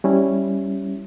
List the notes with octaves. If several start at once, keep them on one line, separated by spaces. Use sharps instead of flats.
G3 C#4 E4